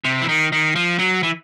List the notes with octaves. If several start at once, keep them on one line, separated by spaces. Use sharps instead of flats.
C3
E3
D#3
D#3
F3
F#3
E3